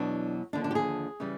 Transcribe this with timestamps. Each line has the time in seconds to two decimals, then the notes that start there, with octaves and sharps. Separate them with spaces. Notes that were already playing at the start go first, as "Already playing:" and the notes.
Already playing: E2 B2 F#3 D4
0.53 D#2 D3 F3 D4
0.64 D4
0.71 G4
0.75 G#4
1.20 C#3 E3 G3